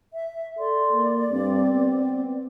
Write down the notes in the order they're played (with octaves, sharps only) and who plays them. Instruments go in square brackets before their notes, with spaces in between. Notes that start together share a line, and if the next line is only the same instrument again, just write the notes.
[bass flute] E5
[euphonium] A4 [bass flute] D5 [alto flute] C6
[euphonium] A#3
[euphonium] G2 [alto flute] C4
[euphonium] B3